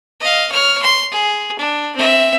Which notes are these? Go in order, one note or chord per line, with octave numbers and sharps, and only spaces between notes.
D#5 F5
C#5 F6
C6
G#4
D4
C4 E5